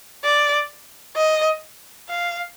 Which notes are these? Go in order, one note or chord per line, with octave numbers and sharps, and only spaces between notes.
D5
D#5
F5